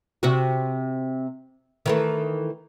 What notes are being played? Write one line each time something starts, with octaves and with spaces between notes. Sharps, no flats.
C3 C4 F#4
D#3 E3 A3